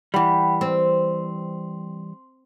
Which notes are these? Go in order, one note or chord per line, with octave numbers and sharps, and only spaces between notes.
E3 G3 F#5 G5 B5
C4 C6